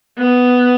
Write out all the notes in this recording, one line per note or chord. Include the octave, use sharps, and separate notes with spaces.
B3